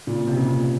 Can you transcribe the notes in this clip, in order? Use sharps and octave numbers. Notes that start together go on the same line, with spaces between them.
A#2 C#3
C3
A#2 C#3